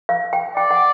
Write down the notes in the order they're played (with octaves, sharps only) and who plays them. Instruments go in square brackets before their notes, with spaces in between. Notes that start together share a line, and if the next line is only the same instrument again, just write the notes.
[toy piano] F5
G5
[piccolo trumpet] D5 [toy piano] G5
[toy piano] F#5